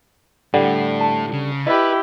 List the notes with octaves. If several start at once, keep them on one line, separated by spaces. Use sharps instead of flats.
A2 D3 G3 F#5
A5
C#3
E4 G4 B4 D#5